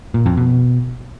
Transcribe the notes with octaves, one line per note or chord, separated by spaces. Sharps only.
A#2
F2
B2